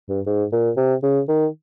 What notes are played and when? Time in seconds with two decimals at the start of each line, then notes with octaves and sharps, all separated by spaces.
0.09 G2
0.26 G#2
0.52 A#2
0.77 C3
1.03 C#3
1.28 D#3